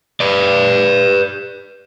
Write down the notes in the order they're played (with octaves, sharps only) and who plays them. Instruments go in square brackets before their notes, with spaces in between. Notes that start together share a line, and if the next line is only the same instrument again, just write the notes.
[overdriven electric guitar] B4 D5